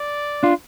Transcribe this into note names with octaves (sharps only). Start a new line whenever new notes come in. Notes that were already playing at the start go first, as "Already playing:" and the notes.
Already playing: D5
D4 F4